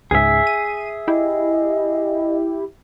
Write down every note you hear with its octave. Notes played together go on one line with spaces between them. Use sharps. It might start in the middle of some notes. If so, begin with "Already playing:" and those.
C#2 G#2 G#4 E5
D#7
E4 G4 D#5